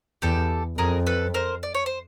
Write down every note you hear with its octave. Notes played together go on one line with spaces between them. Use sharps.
E2 G4 A4
F2 G#4 A#4
A4 B4
A#4 C5
D5
C#5
C5